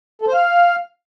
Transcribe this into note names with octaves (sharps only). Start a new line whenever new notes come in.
A4
C5
F5